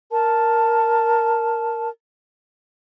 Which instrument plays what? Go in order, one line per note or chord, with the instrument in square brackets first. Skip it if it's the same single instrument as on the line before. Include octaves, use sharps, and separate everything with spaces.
[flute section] A#4 A5